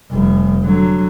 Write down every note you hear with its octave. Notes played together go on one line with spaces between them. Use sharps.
F1 G3
D3 F#3